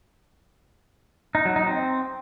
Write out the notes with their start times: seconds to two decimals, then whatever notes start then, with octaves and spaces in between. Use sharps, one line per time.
1.35 D#4
1.45 F#3
1.56 D#4
1.67 C4